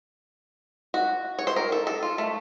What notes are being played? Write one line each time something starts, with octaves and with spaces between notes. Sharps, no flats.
F#4
C#5
C5
A#4
A4
A4
F4
A3